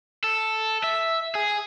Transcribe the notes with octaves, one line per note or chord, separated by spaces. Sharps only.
A4
E5
G#4